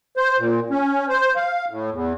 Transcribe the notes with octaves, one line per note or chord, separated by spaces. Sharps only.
C5
A#2
C#4
C5
F5
A2
E2